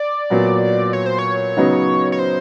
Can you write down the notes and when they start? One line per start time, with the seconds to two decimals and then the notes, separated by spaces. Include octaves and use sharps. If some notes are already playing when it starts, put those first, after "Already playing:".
Already playing: D5
0.30 A#2 F#3 B3
0.93 C#5
1.06 C5
1.19 C#5
1.57 C#3 F#3 B3 D#4
2.12 C#5
2.19 C5